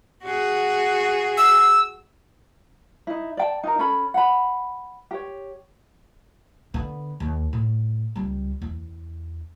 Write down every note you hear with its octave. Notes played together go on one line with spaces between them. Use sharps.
F#4 G#4
E6
D#4 E4
D5 G5 A5
D#4 A#4
C#4 A4 B5
F#5 B5
G4 C#5
D3 B3
D#2
A2
C#2 G3
E2